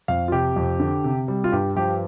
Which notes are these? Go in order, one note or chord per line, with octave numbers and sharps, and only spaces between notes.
F2 F5
F4
C3 G4
F2
D3
C3
G3
F4
G2 G4
F3 G4